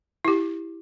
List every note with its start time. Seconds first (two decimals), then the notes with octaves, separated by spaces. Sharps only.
0.25 E4 G4